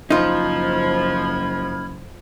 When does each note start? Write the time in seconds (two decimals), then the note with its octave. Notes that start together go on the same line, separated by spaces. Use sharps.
0.10 F#1 F3 D#4 F4 B5 F6 G#6